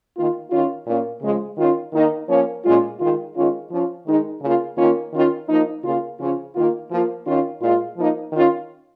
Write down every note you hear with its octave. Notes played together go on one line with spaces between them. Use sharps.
D#3 A#3 F4
D#3 C#4 F4
A#2 A#3 C#4 F4
C#3 F3 G#3
D#3 C#4 F4
D#3 A#3 D#4
F3 A#3 C#4
A#2 G#3 C#4 F4
D#3 G#3 F4
D#3 G#3 C#4 F4
F3 C#4 F4
D#3 G#3 D#4
C#3 A#3 F4
D#3 A#3 C#4 F4
D#3 C#4 F4
F3 A#3 D#4
C#3 A#3 F4
C#3 F3 C#4 F4
D#3 A#3 F4
F3 A#3 F4
D#3 C#4 F4
A#2 G#3 F4
F3 A#3 D#4
D#3 C#4 F4